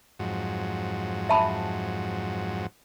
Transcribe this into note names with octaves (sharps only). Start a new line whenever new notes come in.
F2 G#2 F#3
E5 A5 B5